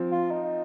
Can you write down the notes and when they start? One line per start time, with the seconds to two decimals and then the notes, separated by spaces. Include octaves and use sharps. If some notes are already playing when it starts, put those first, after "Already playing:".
Already playing: F3 C4
0.11 F4
0.31 D#4